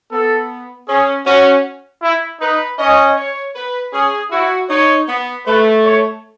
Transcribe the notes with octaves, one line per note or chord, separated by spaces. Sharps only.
B3 A4
C#4 G#4
C#4 F#4
E4
D#4 B4
C#4 D#5
C#5
B4
C#4 G#4
E4 F#4
D#4 C#5
B3
A3 B4
C#5